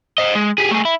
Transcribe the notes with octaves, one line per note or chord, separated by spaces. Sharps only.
C5 D#5
G#3
G4 G#4
A3 G#4
E4